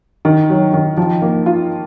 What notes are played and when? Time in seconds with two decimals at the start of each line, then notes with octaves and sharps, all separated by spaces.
0.25 D#3
0.50 F#3
0.74 D#3
0.97 F3
1.22 A#3
1.46 F4